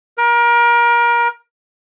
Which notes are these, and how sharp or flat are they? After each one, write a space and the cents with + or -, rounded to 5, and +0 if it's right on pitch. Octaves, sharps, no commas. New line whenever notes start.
A#4 +30